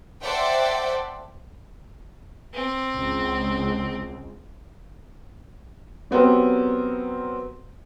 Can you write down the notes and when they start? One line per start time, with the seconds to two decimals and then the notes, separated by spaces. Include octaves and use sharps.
0.21 A4 C5 D5 E5 F#5 G5
2.54 C4
2.94 C#2
6.11 F#3 B3 C4 G4 A#4